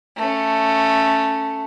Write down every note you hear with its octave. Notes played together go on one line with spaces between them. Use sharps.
A3 C#4